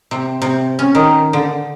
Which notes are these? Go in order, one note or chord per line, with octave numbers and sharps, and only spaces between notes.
C3
C3
C#4
D#3
D3